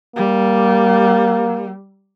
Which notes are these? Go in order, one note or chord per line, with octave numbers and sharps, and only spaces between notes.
G3 A#3